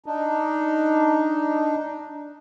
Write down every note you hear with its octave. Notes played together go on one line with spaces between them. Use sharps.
D4 D#4